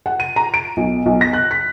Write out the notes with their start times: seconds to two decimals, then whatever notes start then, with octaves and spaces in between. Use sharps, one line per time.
0.06 F#5
0.20 D#7
0.36 A#5
0.54 D7
0.77 B1
1.06 B1
1.21 A#6
1.33 F#6
1.51 B6